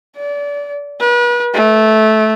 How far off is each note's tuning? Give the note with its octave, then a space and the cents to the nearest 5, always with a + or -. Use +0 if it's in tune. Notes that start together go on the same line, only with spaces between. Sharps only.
D5 -30
B4 -40
A3 -15